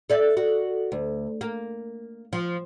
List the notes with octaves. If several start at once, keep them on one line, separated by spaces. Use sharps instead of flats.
A4 D5 E5
F#4
D2
A#3
F3